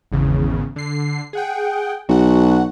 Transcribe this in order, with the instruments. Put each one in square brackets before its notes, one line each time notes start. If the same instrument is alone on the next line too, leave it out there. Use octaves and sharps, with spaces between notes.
[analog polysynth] G#1 E2 C#3
D3 C7
G#4 F#5 G5
[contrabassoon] B1 [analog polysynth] F#4 F#5